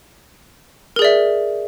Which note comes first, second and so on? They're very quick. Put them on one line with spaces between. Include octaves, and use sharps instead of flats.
A#4 G#4 D5 E5